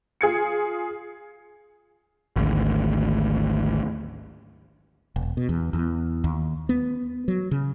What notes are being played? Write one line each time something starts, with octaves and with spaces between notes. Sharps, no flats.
F4 G#4 G#6 C#7
G#1 D2
E1
B2
E2
E2
D#2
B3
F#3
C#3